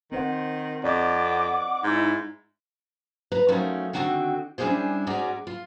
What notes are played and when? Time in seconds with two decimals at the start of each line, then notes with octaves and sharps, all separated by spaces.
0.12 D#3 C4 C5 F#5
0.84 F2 D5 D#5 F#5 D6
1.84 G#2 D#4 E4
3.32 B4 A#5
3.48 F3 F#3 A3 C#4 D#4 A#4
3.93 D3 D#3 C4 D#4 F#4 G5
4.58 G3 C#4 D4 E4 G#4 C5
5.07 G#2 G#3 C#4 F#4 D5 A#5
5.47 F4